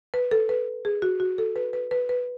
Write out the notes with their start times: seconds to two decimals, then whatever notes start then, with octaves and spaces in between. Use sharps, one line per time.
0.14 B4
0.31 A4
0.49 B4
0.85 G#4
1.02 F#4
1.20 F#4
1.38 A4
1.56 B4
1.73 B4
1.91 B4
2.09 B4